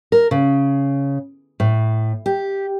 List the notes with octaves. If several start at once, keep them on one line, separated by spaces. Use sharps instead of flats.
A#4
C#3
A2
G4